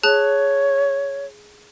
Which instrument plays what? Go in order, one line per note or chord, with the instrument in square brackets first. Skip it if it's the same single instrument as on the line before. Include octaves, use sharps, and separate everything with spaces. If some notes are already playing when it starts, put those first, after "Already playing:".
[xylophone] G#4 A5 F#6 [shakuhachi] C#5